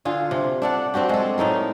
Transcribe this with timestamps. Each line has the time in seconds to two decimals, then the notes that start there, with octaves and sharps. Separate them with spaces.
0.05 D3 F4 G#4
0.31 C3
0.62 D4 A4 F#5
0.94 C4 D4 F#4 G4
1.09 G#3 A4
1.38 A2 D#4 A4 A#4